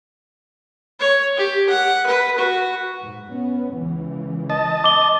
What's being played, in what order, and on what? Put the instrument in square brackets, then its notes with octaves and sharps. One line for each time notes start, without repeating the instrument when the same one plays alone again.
[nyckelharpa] C#5
G4
F#5
B4
F#4
[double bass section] G#2
B3 C#4
C#2 C#3 E3
[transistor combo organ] D#5 A5
[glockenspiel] D6 G7